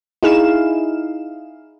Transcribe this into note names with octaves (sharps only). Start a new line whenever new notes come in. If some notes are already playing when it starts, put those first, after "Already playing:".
D#4 E4 G#4 F5 E7